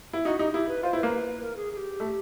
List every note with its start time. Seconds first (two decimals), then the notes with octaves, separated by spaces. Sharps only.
0.13 E4
0.25 D#4 F#4
0.39 D#4 G4
0.54 E4 G4
0.69 B4
0.83 F4 C5
0.93 E4
0.99 A#3 B4
1.42 A#4
1.56 G#4
1.72 G#4
1.77 G4
2.00 A3